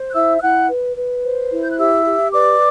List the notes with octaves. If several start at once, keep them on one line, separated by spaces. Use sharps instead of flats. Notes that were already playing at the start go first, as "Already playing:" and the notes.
Already playing: C5
F#6
E4 E5 E6
E6
E4 F#5 F#6
B4
B4
C5
E4
G6
F#6
G4 E5 E6
G4
B4 D5 D6